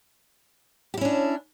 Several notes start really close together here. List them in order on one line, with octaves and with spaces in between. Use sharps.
G4 E4 C#4 D4